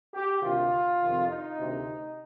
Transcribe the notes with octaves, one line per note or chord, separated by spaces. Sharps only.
G4
D2 C3 D#3 F4
F2 C3 D#3
D#4
D2 C3 D#3